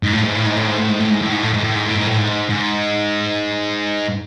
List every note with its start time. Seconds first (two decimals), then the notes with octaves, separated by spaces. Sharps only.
0.03 G#2
0.13 A2
0.24 G#2
0.35 A2
0.46 G#2
0.56 A2
0.67 G#2
0.78 A2
0.89 G#2
0.99 A2
1.10 G#2
1.22 A2
1.32 G#2
1.42 A2
1.53 G#2
1.64 A2
1.75 G#2
1.86 A2
1.96 G#2
2.07 A2
2.18 G#2
2.50 G#2